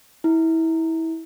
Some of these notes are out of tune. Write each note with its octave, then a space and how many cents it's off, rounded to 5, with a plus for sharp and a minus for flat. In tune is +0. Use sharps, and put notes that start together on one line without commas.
E4 -25